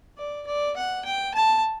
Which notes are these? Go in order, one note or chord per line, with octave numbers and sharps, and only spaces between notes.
D5
D5
F#5
G5
A5